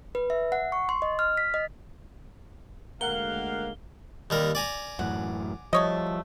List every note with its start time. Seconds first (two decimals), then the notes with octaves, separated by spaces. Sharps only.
0.15 B4
0.30 E5
0.52 F#5
0.72 C#6
0.89 C6
1.02 D#5
1.19 F6
1.37 B6
1.54 D#5
3.01 D2 G#3 A#3 A#4 F5 F#5 F#6 G7
4.30 D#2 G3 A#4
4.55 D5 G#5 A#5
4.99 F#2 A2 E3 F#5
5.73 F3 G3 A3 C#5 D#5